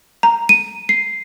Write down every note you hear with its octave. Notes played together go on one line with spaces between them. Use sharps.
A#5
D#7
C7